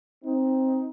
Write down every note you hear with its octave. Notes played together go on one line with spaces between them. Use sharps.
C4 D#4